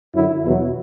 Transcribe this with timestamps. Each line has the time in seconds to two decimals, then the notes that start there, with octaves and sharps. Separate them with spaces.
0.15 F#2 D3 F#3 E4
0.44 E2 B2 F#3 E4